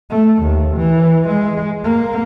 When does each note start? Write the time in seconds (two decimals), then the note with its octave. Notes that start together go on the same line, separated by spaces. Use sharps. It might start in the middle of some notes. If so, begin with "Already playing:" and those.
0.10 A3
0.43 D#2
0.76 E3
1.29 G#3
1.84 A#3